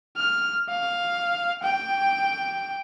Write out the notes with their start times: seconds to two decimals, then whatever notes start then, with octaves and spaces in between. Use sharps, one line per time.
0.16 F6
0.69 F5
1.63 G5